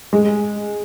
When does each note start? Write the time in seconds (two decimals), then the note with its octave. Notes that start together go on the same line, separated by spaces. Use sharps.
0.13 G#3